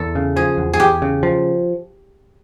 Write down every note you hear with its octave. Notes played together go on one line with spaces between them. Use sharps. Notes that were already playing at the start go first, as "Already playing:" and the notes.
Already playing: E2 A4
C#3
F3 G#4
E2
G#4
E2 G4
C#3
F3